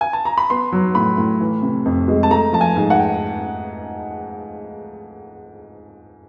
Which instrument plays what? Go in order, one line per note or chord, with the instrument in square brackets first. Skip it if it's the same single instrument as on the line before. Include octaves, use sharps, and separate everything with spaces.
[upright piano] G#5
A5
A#5
B5
B3 C6
F#3
A2 B5
A2
E3
C3
F2
G#3
A5
A3 A#5
F3 A5
G#5
G#2
F#5
G5